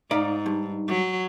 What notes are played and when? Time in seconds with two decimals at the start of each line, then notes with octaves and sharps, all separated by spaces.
0.11 G#2 D#4 D5 F5
0.46 G2
0.88 F#3